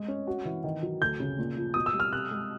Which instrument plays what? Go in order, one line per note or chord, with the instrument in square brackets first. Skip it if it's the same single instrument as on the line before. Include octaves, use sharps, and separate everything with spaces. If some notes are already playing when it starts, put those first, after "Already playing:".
Already playing: [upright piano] G#3
C#4
F#4
E3
D#3
F#3
[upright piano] D2 [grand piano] G6
[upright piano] C#3
A#2
F3
[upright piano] B2 [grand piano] D#6
[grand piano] E6
[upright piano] G3
[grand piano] F6
[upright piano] C3 [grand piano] F#6
[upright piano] G#3